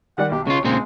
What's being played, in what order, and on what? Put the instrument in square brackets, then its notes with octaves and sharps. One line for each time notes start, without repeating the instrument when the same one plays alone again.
[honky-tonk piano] D#3 G3 D5 [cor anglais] F#5
[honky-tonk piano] B1 [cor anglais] G4
[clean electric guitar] C#3 F4 [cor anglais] C#5
[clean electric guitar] A#2 C#3 C4 [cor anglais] G#3